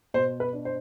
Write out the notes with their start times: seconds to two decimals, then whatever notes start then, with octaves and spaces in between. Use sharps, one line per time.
0.14 B2 C5
0.40 B4
0.53 D4
0.65 C5